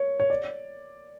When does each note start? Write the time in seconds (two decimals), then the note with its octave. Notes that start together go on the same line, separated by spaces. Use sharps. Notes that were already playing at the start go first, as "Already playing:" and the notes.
Already playing: C#5
0.20 C#5
0.30 D5